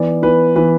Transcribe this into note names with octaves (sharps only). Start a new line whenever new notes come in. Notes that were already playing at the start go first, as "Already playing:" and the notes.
Already playing: E3 B3 D5
E3 B3 B4
E3 B3 B4